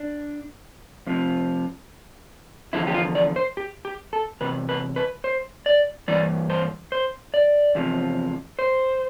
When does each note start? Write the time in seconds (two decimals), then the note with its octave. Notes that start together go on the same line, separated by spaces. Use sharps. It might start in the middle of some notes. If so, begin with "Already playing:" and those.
Already playing: D4
1.07 F2 C3 F3
2.73 E2 D3 F3 E4
2.87 G4
2.94 F4
3.15 D5
3.36 C5
3.57 G4
3.85 G4
4.13 A4
4.41 E2 C3 B4
4.69 B4
4.96 B4
5.24 C5
5.66 D5
6.08 G2 E3 D5
6.50 C5
6.92 C5
7.34 D5
7.75 E2 C3 F3
8.59 C5